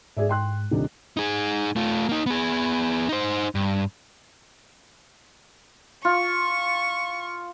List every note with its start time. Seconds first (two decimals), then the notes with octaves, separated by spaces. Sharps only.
0.17 G#2 G#4 D5 E5
0.29 G5 C6 F#6
0.71 D#1 C3 D4 D#4
1.17 D#4 G#4
1.76 A3 F4
2.09 A#3 D#4
2.26 B3 G#4
3.09 D#4 C5
3.55 G2
6.05 F4 C#6